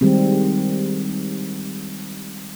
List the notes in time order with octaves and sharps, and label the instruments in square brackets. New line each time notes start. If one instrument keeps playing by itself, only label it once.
[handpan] D#3 G3 G#3 C4